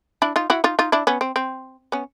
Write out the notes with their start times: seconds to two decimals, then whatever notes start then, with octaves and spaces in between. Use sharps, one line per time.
0.22 D4 E4
0.36 D#4 F4
0.50 E4 F#4
0.64 D#4 F4
0.79 D#4 F4
0.92 D4 E4
1.07 B3 C#4
1.21 C4
1.36 C4
1.92 B3 C#4